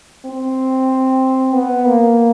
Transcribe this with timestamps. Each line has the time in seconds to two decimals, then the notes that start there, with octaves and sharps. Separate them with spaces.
0.25 C4
1.54 B3
1.86 A#3